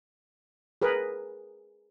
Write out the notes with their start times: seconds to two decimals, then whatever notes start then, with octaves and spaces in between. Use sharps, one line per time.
0.82 G#4 A#4 B4